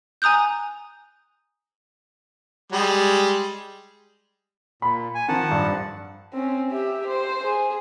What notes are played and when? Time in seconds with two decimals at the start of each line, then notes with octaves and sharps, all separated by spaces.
0.22 G#5 A#5 D#6 F#6 G6
2.72 G3 G#3
4.82 A#2 B5
5.15 G#5
5.28 D#3 F3 F#5 A5
5.51 G2
6.34 C4 C#4
6.71 G4 E5
7.07 C5
7.43 G#4